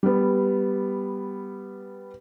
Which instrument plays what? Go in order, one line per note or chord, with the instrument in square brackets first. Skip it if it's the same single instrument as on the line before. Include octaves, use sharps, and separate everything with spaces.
[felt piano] G3 B3